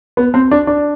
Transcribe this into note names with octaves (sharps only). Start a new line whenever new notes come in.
B3
C4
D4
D4